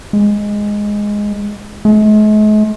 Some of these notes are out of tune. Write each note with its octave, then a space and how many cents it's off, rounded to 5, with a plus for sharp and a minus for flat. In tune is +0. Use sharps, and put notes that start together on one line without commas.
G#3 -5
G#3 +45